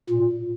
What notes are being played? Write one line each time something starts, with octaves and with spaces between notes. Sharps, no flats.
A#2